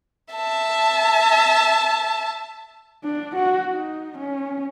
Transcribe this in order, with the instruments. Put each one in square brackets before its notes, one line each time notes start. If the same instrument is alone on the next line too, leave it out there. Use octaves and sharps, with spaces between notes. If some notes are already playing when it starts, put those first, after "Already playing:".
[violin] E5 A5
[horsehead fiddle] D4
F#4
D#4
C#4